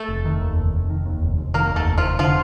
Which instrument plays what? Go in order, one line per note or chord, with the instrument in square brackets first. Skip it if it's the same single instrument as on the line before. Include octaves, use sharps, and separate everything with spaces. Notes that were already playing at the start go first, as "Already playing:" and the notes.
Already playing: [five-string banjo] A3 A4
[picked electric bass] F1
D#3
D#2
F1
F1
D#3
D#2
F1
F1
[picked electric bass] D#3 [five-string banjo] A#3 A#4
[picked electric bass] D#2
[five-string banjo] A3 A4
[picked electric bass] F1
[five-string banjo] F3 F4
[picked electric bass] F1
[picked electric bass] D3 [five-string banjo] F3 F4